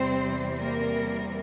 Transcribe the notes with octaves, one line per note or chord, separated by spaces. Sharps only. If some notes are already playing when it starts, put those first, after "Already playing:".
Already playing: E2 C3 G3 C4 C5
A#3 A#4